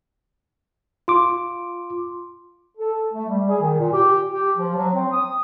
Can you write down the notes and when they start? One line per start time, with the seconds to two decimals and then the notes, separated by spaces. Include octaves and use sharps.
1.08 F4 C6 D6
2.78 A4
3.13 A3
3.29 G3
3.49 G#4
3.62 D#3
3.79 A#2
3.93 G4
4.32 G4
4.57 F3
4.75 F#3
4.94 C4
5.12 D#6